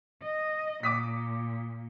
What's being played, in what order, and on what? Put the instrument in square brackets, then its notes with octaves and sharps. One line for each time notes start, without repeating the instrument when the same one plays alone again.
[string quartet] D#5
[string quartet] A#2 [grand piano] D6 D#6 B6